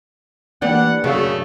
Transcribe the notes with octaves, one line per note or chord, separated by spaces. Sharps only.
E3 A#3 D4 G4 F#5
F#2 C#3 A3 F5